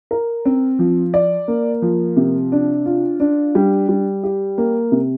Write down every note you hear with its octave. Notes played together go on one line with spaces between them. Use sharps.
A#4
C4
F3
D5
A#3
F3
C3
D4
F4
D4
G3
G3
G4
A#3
C3